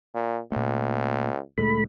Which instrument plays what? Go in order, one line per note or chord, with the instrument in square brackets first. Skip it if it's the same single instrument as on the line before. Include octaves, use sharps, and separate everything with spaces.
[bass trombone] A#2
[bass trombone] C#2 [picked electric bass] A#2 A3
[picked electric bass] D2 A#2 G#3 [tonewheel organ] A3 B5